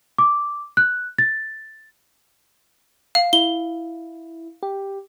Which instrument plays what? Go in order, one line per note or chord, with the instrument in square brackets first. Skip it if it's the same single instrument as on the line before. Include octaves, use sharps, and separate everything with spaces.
[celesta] D6
F#6
A6
[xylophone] F5
[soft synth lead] E4 [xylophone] G7
[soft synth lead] G4